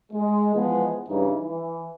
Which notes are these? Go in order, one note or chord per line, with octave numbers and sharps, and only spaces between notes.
G#3
E3 F3 G#3 B3
G2 C#3 E3 D#4
E3